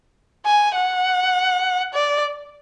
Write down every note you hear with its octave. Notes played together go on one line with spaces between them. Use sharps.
G#5
F#5
D5